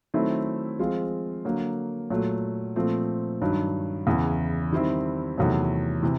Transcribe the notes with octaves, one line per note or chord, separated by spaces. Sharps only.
D#3 F#3 A3 C4 E4
F3 G#3 C4 F4
D3 F#3 A#3
A#2 F#3 A3
A#2 F3 A3 C4
G2 D#3 F#3
E2 C#3 E3
D#3 G3 C4 E4
E2 C3 D#3 F#3 A3
C3 E3